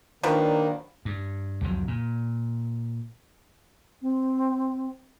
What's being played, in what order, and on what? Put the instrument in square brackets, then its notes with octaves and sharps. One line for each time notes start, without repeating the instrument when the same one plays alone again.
[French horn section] A#2 A#3 D4 [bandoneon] D#3 [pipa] F3 F#3 B4
[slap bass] G2
C2 F2 C3 F#3
A#2
[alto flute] C4